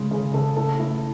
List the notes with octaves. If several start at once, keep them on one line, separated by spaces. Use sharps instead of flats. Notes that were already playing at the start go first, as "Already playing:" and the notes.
Already playing: C#3 G#3
C#3 G#4
C#3 A4
A2 A4
A2 E4